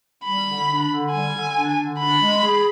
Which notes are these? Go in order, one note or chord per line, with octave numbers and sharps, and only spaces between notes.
G3 B5
D3
D4
D3
G3 G#5
D3
D4
D3
D4 B5
G#3
G#4